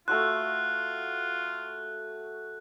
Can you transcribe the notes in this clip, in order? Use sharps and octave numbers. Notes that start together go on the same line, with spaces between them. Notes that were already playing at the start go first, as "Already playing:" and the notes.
A3 F4 F#4 C6 F#6